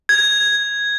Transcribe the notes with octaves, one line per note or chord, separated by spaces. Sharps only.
G#6